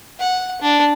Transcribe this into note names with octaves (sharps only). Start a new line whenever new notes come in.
F#5
D4